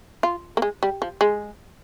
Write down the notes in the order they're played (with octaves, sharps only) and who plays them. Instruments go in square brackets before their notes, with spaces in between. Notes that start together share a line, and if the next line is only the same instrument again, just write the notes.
[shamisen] F4
A#3
G#3
G3
F3
G#3